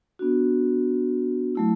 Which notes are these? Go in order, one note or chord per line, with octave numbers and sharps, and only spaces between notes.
B3 D4 F#4
F#3 A3 E4